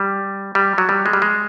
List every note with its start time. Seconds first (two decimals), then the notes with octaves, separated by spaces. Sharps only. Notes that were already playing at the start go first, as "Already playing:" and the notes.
Already playing: G3
0.55 G3
0.78 F#3
0.89 G3
1.06 G#3
1.13 G3
1.22 G#3